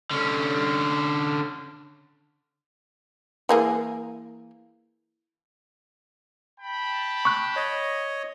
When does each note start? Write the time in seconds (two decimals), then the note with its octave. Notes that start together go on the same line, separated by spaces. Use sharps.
0.11 D3 C#4
3.49 E3 A#3 G#4
6.60 G5 A5 B5
7.25 C#6 F#6
7.56 C#5 D#5